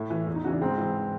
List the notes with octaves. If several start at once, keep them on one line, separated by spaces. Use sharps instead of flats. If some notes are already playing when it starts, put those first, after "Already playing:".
Already playing: A2 E4
E3
E2 E4
D#4
C#3 E3 F#4
D4
G#2 C4
E3